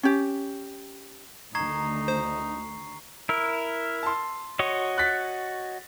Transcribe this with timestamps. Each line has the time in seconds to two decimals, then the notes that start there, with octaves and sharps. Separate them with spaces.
0.03 C#4 G4
1.55 D2 D#3 D#4 A#5 C#6 G#6 C7
2.08 C5
3.29 E4 A#4
4.03 A5 C6
4.59 F#4 C#5 D#5
4.98 F#6 A6 B6